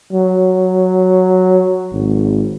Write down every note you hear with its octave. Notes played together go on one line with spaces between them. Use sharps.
F#3
G#1